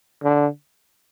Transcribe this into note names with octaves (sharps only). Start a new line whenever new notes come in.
D3